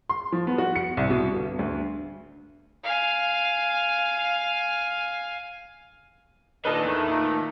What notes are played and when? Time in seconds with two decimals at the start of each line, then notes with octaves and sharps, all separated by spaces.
0.09 C6
0.32 F3
0.47 B3
0.58 F#4
0.76 C#7
0.97 C2
1.10 B2
1.33 G1
1.59 D2
2.84 F5 G#5
6.65 A#2 D#3 D4 B4 D#5 A5
6.83 E2 A3
7.08 A#2 A#5